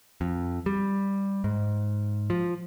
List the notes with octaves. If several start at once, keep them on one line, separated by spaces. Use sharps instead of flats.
F2
G3
G#2
F3